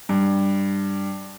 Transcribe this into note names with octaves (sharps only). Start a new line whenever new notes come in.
G2